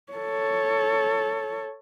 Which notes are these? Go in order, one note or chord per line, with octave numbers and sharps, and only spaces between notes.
A4 C#5